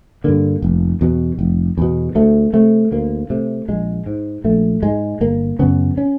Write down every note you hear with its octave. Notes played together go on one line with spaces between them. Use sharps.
G2 D3 A#3
F1
E2 B2
F1
E2 B2
D2 A3
C3 A3
D2 A#3
C3 A3
A#1 G#3
G#2
A#1 A3
G#2 G#3
G1 A#3
F#2 C#3 B3
C#4